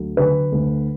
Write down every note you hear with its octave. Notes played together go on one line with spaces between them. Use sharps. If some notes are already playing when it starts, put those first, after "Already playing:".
Already playing: D2 F#3
D3 B4
D2